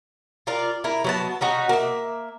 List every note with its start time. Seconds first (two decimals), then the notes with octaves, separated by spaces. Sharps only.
0.47 F4 A#4 D5 F5
0.84 E4 A#4
1.04 F#3 B3 A5
1.41 C#4 D#4 F#4
1.69 A#3 E5